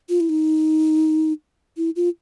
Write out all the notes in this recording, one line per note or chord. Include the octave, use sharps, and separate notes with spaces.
F4
E4
D#4
E4
F4